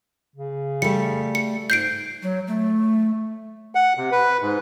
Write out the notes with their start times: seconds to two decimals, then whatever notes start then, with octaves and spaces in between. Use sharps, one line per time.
0.36 C#3
0.82 G3 A3 C#7
1.35 C#7
1.70 G#2 G6 C7 D7
2.22 F#3
2.47 A3
3.75 F#5
3.97 C3
4.12 B4
4.41 G#2